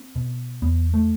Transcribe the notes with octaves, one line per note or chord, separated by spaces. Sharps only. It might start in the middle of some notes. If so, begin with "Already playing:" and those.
Already playing: C4
B2
E2 B3
A3